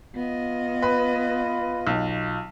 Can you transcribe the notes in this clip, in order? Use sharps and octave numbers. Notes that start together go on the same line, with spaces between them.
B3 F4 D#5
B4
B1